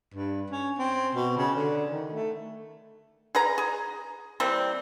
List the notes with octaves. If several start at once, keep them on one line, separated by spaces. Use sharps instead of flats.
G2
C#4
C4
B2
C#3
D3
D#3
A3
G#4 B4 A#5
G#4
E3 G3 A#3 C4